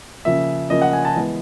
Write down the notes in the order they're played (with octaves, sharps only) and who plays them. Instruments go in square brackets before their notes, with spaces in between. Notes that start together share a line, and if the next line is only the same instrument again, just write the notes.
[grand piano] C#3 F3 A#3 E5
C#3 F3 A#3 D#5
F#5
G#5
A5
E3 G#3 B3